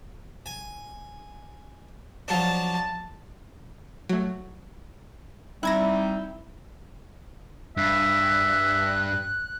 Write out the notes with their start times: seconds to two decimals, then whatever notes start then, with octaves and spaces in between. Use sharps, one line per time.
0.46 G#5
2.28 F3 F#3 D4 A5
4.09 F#3 A3
5.63 G3 C4 D#4 E4 F#6 G#6 A#6
7.77 G2 E5 F#6